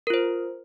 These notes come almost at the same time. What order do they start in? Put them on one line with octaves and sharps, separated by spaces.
A#4 F4 C5